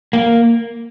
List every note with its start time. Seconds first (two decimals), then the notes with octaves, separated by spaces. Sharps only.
0.13 A#3